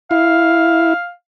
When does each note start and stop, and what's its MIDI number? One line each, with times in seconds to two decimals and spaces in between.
0.11 0.94 64
0.11 1.10 77